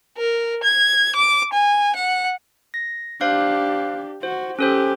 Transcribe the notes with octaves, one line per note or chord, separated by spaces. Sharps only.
A#4
G#6
D6
G#5
F#5
A#6
D4 G4 C5 F5 F#6
F#4 C5
C#4 G4 A4 C5